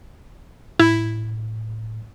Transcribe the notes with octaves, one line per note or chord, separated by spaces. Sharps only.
A2 E4